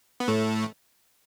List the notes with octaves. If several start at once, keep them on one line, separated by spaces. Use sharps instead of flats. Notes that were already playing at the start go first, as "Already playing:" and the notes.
B3
A2 A3